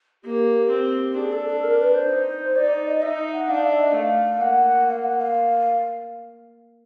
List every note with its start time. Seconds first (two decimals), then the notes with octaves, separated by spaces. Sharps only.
0.24 A#3 G4
0.70 C4
1.17 D4 G#4
1.32 A4
1.48 A4
1.63 A#4
1.79 B4
1.94 C5
2.10 D#4
2.56 D#4 D5
2.72 D5
2.87 D#5
3.02 D#4 E5
3.34 F#5
3.49 D4 F5
3.64 E5
3.79 D#5
3.95 A3 F5
4.41 A#3 F#5
4.88 F5
5.04 F#5
5.18 F5